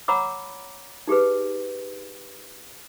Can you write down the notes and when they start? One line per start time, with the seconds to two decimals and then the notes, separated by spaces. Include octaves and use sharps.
0.08 C#5 F#5 A#5 B5 D6 E6
1.07 D#4 G4 G#4 B4